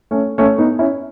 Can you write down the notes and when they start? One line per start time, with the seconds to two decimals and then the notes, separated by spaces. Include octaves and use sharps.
0.11 A3 C#4
0.38 A3 C#4
0.58 B3 D#4
0.79 C#4 E4